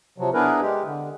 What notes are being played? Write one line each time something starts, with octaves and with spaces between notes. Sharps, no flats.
C3 F3 F#3
B3 D4 E4 G#4 A#4 B4
G#3 G4
D3